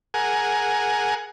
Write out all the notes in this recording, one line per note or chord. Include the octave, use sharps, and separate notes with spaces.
G#4 A#4 F#5 G#5